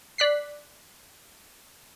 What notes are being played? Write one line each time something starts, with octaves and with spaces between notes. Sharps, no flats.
D5 F#6 B6 C7